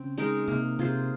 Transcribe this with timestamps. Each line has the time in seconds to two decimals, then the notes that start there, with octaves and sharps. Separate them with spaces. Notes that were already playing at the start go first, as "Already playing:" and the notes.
Already playing: C#3 C4
0.18 G#3 D#4 A#4
0.48 C3 A#3
0.79 C3 F4 G#4 C5